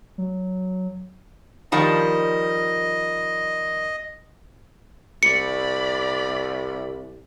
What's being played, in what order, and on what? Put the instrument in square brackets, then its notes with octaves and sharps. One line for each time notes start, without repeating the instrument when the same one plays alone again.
[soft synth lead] F#3
[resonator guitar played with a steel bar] D#3 F3 G3 [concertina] D#5
[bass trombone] C2 [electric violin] D5 B5 [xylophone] C#7